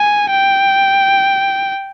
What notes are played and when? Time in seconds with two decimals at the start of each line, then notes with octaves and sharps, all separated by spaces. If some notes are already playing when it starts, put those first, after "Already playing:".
Already playing: G#5
0.30 G5